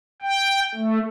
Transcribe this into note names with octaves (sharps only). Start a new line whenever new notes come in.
G5
A3